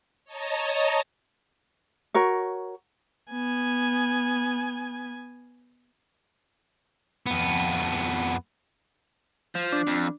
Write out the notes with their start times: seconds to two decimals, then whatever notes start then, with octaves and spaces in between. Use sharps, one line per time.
0.25 C#5 D#5 A5 A#5
2.14 F#4 A#4 C#5
3.31 B3 G#5
7.26 F2 B3
9.55 F3
9.72 D4
9.87 F2